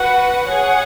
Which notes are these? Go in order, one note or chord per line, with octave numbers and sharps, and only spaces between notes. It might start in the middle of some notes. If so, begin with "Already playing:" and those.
Already playing: F#4 B4 F#5
G#4 C#5 F#5